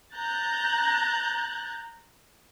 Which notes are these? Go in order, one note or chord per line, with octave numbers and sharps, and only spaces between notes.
A#5 F#6 G6 A6